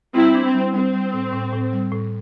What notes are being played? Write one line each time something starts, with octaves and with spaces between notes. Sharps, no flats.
G3 C4 E4
D4
C4
G3
G3 C4
G3
A2
A2
A2
G3
A2